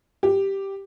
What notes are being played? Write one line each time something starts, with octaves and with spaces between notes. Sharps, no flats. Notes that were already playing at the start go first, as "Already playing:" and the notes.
G4